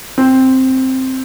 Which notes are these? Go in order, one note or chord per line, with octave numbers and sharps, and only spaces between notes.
C4